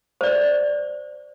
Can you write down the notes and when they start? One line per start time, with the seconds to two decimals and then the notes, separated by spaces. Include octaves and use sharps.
0.21 C5 D5